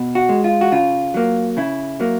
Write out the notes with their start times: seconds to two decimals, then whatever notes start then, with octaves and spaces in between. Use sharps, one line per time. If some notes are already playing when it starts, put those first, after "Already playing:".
Already playing: B2
0.15 F#4
0.29 G#3
0.44 F4
0.61 F#4
0.72 C#3 F4
1.14 F#3 A#3
1.57 C#3 E4
2.00 F#3 A#3